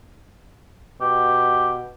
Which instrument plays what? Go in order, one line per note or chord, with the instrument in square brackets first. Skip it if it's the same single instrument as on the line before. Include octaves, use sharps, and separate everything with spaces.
[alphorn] B2 [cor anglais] G4